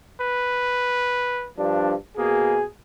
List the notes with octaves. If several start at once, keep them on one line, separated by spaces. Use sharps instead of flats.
B4
G2 F3 D4
B2 A#3 G#4